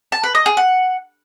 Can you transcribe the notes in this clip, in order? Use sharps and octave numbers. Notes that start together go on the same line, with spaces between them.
A5
B4
D#5
G#4
F#5